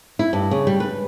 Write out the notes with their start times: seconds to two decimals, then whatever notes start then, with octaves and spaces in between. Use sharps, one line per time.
0.19 E4
0.33 G2
0.51 C#3
0.67 G3
0.80 B4